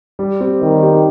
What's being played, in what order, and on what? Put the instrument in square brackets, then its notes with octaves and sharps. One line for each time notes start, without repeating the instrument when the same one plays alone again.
[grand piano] G3
C4 G4
[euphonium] D#3 [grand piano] G3
[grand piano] C4 G4